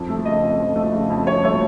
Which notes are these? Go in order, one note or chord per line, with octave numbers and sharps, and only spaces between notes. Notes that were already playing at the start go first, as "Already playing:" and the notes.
Already playing: F2
A3
C#3 D#5
F2
F2
A3
C#3
F2
F2 C#5
A3 C#5